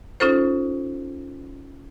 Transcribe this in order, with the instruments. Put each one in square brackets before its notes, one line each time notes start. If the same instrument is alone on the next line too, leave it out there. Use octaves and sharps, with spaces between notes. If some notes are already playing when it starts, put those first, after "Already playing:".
[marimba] C#4 D#4 F4 A4 C5